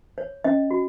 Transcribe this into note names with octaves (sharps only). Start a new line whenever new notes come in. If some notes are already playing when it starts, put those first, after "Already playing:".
C#5
C#4 D#5
F#4